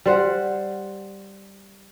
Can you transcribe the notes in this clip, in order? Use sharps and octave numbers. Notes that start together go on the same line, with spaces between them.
G3 C5 F#5